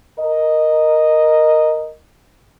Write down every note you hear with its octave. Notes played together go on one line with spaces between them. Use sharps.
A#4 D#5